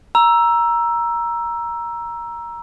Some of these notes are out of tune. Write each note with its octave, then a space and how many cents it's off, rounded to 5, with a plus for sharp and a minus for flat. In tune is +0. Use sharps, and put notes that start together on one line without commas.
A#5 +15 E6 +10